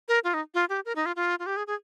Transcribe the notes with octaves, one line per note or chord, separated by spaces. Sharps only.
A#4
F4
D#4
F4
G4
A#4
D#4
F4
F4
F4
G4
G#4
G#4